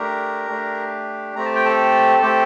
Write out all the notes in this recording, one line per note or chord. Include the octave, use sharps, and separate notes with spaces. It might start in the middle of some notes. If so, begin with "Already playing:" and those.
Already playing: A3 D4 G4 A#4 A#5
A3 D4 G4
A3 C4 G4 A#5
A5
G5
A4 A5
A3 C4 G4